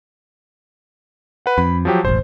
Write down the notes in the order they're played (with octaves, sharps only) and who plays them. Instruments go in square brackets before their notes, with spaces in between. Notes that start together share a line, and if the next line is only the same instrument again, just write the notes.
[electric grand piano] B4 F#5
[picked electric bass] F2 [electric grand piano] B5
[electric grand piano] F3 F#3 G4
[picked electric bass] E1 A1 [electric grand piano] C5